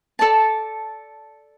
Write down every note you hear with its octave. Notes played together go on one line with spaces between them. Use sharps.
A4 D5 A5